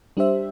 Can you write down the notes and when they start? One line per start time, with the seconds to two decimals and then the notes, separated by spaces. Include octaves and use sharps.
0.17 G3 D4 G4 C5 E5